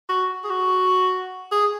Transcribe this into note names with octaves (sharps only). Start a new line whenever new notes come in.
F#4
G#4
F#4
G#4